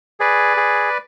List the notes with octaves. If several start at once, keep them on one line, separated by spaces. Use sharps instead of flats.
G#4 B4 D5
G#4